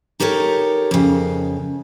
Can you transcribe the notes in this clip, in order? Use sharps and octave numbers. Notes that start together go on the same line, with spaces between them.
D#4 G4 A4 A#4 C#5
F2 C#3